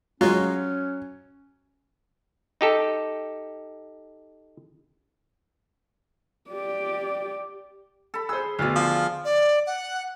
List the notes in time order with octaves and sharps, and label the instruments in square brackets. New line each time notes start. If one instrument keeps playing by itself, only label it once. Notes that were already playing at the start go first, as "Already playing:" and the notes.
[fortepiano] F#3 [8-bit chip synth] G#3 F4 [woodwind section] C#4
[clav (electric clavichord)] D#4 G4 A4
[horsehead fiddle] G4 D5
[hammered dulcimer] A4 B5
[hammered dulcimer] G#4 [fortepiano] C5 E6
[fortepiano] D2 B2 [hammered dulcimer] D5 F5
[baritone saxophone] F3
[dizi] D5
F#5